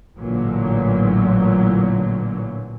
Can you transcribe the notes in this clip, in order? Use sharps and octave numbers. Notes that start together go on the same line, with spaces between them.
A1 A#2 D3 E3 F#3